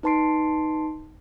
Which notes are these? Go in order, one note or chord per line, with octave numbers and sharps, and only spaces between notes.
D#4 B4 A5 C6 C7 D7